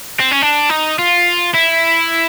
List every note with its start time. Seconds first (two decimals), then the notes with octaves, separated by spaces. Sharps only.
0.20 C4
0.31 C#4
0.42 D4
0.69 D#4
0.99 F4
1.54 E4